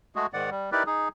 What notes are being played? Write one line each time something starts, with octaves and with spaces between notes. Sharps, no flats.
G#3 A3 F#4 G#4
G#2 D#3 D5 F#5
G3
D#4 E4 G4 A#4 B4 D5
D#4 G#4